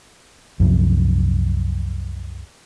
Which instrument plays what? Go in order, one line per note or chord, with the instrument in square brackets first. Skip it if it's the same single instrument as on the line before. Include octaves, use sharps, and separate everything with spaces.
[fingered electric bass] C2 F#2 C3 F3